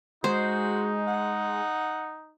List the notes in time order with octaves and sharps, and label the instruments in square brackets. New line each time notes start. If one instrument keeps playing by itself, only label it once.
[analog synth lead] G#3 [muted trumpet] D#4 [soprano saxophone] F#4 [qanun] C5
[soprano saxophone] F#5